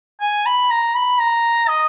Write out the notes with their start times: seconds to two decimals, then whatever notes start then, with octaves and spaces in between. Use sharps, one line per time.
0.20 G#5
0.46 B5
0.70 A#5
0.95 B5
1.19 A#5
1.68 D#5